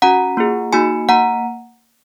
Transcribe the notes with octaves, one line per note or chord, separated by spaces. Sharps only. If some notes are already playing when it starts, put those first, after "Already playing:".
C#4 F#4 F#5 A#5
A#3 F4 G#4
A#3 D#4 F#4 G#5 B5
A#3 F#5 A#5